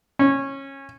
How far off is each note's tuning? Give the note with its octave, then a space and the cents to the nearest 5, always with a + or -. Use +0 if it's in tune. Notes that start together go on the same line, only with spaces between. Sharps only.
C#4 -20